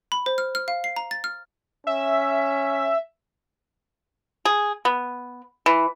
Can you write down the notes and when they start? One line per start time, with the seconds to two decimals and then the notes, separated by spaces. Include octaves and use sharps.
0.12 B5
0.26 C5
0.38 F6
0.55 F6
0.68 F5
0.84 C7
0.96 A#5
1.11 A6
1.24 F6
1.87 C#4 E5
4.45 G#4
4.85 B3
5.66 E3